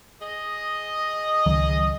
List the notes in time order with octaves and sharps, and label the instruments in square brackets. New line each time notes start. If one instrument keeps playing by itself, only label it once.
[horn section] G#4 D#5
[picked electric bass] C#2 D#3 F#3